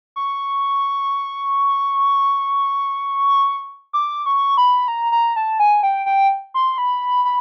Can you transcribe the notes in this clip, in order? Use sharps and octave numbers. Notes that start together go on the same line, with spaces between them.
C#6
D6
C#6
B5
A#5
A#5
A5
G#5
G5
G5
C6
B5
B5